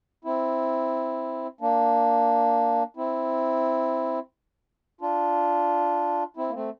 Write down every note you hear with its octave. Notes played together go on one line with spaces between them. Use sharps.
C4 E4
A#3 D4
C4 E4
D4 F4
C4 E4
A#3
A3 C4